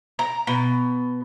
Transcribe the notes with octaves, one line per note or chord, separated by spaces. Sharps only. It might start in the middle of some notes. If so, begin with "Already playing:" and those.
A#5
B2